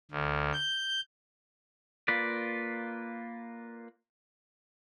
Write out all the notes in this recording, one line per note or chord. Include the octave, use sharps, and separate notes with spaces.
D2
G6
A#3 F4 B4 D5